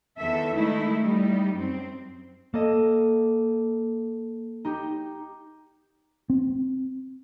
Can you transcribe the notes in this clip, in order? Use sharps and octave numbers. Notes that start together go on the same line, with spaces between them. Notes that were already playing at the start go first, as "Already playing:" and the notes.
E2 D#3 A4 E5
D#3 G#3 A3 D#4 E4
G3 D#4
F#2 C4
A#3 A4 D#5
D#4 G4
C4